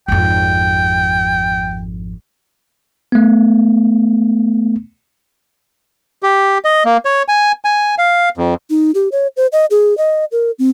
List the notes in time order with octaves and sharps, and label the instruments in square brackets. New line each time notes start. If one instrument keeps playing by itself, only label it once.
[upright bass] G#1 F2 [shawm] G5
[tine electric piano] A3 B3
[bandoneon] G4
D#5
A#3
C#5
G#5
G#5
F5
F2
[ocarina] D#4
G4
C#5
C5
D#5
G#4
D#5
A#4
C4